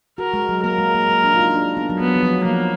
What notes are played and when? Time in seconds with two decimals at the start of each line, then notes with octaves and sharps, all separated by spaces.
0.18 F#4 A#4
0.34 G#3
0.49 F#3
0.63 A#3 A#4
0.79 G#3
0.94 A#3
1.09 A#3
1.24 D4
1.35 F4
1.39 D#4
1.54 D4
1.77 B3
1.90 F#3
1.99 G#3 B3
2.16 F3
2.22 F#3
2.44 F3 A#3